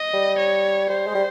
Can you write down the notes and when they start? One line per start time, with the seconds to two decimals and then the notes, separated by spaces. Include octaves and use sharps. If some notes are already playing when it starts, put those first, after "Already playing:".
Already playing: D#5
0.14 G3
0.39 C#5
0.90 G3 C5
1.07 G#3
1.15 G3